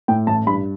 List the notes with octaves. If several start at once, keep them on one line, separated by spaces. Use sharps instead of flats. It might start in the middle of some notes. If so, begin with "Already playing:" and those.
A2 G5
A1 A5
G2 B5